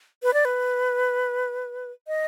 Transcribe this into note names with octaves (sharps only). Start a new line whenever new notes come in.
B4
D5
B4
D#5